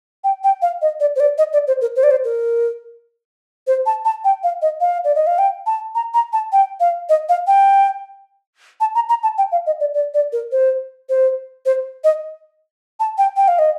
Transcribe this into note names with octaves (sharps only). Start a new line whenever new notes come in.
G5
G5
F5
D#5
D5
C5
D5
D#5
D5
C5
A#4
C5
D5
C5
A#4
C5
A5
A5
G5
F5
D#5
F5
D5
D#5
F5
G5
A5
A#5
A#5
A5
G5
F5
D#5
F5
G5
A5
A#5
A#5
A5
G5
F5
D#5
D5
D5
D5
A#4
C5
C5
C5
D#5
A5
G5
G5
F5
D#5